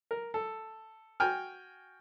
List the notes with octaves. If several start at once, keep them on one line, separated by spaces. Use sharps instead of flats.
A#4
A4
F#4 G5 G#5 F6